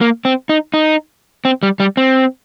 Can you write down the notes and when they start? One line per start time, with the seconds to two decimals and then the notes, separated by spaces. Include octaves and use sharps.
0.01 A#3
0.25 C4
0.49 D#4
0.74 D#4
1.45 C4
1.63 G3
1.80 G3
1.97 C4